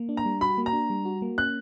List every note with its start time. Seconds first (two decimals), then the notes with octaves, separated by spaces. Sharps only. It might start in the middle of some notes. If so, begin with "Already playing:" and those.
Already playing: A#3
0.09 D4
0.17 A#5
0.25 G3
0.41 F#4 B5
0.58 A#3
0.66 A#5
0.73 D4
0.90 G3
1.05 F#4
1.22 A#3
1.38 C#4 F#6